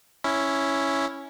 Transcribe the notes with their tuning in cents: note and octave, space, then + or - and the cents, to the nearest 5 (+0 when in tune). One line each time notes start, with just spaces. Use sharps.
C#4 +0 E4 +0